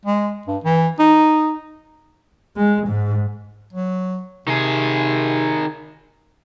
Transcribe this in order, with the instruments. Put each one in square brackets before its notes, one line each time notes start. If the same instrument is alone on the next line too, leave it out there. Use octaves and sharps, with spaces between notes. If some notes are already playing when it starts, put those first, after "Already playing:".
[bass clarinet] G#3
G2
E3
D#4
[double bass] G#3
G#2
[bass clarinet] F#3
[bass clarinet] C3 [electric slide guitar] D#3 G#4